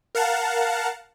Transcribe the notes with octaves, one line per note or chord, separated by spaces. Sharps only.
A#4 F5 F#5 A5